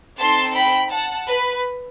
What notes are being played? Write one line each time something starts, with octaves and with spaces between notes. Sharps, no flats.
C4 D#4 A4 A5 C6
G5 B5
F#5 A5
B4